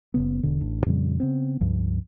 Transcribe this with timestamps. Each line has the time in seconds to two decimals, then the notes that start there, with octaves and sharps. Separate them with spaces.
0.14 F#1 F#2 C#3 B3
0.43 E1 B2 D3
0.61 A1 D4
0.86 F2 A#2 C#3 G3
1.20 C#3 B3 C4
1.61 C#2 G2 F3